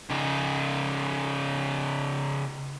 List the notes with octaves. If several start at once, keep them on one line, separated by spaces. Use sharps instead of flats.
C#3 D#4